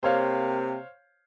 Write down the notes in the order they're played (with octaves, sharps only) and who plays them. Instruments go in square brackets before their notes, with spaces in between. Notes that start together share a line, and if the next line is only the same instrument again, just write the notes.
[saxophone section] C3 A#3 [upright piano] C5 C#5 F5